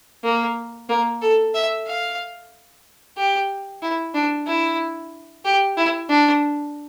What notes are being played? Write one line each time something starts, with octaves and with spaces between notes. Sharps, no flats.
A#3
A#3
A4
E5
F5
G4
E4
D4
E4
G4
E4
D4